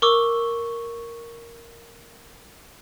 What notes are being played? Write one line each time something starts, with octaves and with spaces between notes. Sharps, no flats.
A#4 C#6 D6 E6